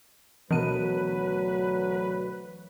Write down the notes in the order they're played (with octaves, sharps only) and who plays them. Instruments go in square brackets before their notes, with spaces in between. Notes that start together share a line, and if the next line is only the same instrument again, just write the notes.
[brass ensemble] D2 F#3 B4 [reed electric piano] B2 B3 A#4 [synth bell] E3 D#7